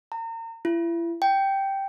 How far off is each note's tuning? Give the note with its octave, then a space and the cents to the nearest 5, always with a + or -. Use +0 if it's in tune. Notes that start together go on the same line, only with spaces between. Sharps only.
A#5 -35
E4 +35
G5 -5